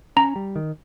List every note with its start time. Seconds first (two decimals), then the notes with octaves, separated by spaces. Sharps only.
0.16 C#4 A#5
0.36 G3
0.56 D#3